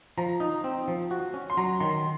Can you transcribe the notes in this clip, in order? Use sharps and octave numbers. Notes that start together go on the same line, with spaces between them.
F3 A#5
D#4
C4
F3
F#4
C#4
C6
F#3 A#5
D#3 C6